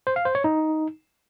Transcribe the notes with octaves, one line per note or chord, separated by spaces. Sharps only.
C5
F5
C5
C#5
D#4